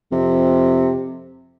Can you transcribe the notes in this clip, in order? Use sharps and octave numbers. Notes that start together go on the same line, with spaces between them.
F2 C3